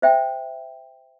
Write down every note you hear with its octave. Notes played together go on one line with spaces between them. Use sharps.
C5 E5 G5